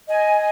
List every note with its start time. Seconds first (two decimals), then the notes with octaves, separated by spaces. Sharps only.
0.09 D#5 G#5